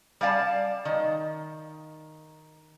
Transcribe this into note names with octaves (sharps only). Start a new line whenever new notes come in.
G3 D5 F5 A5
D#3